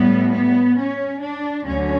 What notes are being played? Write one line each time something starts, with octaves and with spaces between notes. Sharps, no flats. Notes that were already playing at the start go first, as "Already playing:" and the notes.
Already playing: A2 G3 B3
B3
C#4
D4
D2 D3 F#3 C#4